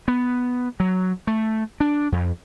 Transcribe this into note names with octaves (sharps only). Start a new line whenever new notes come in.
B3
F#3
A3
D4
F2